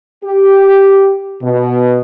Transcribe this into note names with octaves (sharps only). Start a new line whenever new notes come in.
G4
B2